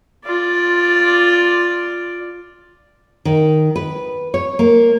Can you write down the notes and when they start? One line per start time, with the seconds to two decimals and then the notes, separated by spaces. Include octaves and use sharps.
0.25 F4 D5
3.25 D#3
3.76 B4
4.34 C#5
4.59 A#3